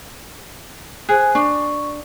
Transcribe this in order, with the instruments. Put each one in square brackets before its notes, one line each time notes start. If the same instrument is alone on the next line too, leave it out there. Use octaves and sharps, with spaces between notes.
[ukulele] G#4 [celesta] C5 G#5 F#6
[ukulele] D4 [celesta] C#6